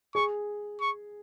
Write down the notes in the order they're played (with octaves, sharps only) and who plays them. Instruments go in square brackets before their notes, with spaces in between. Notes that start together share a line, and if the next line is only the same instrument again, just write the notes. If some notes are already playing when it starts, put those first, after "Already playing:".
[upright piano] G#4 [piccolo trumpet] C#6
[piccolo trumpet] C#6